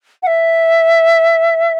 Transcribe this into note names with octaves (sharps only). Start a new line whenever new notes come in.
F#5
E5